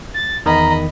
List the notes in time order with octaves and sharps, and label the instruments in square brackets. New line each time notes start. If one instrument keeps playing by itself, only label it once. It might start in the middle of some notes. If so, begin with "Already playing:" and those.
[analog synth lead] A6
[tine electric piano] E2 D#3 [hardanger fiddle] D#5 B5 [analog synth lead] A#5